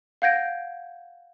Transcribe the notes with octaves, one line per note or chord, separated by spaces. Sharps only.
F5 F#5 G6 G#6 A#6 D7